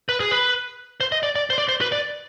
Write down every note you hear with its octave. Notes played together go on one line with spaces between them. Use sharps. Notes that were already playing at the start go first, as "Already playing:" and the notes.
B4
G#4
B4
C5
D#5
D5
D5
C5
D5
C5
B4
D5